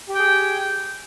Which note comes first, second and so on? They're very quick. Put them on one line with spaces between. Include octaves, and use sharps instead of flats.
G4 G5 G#4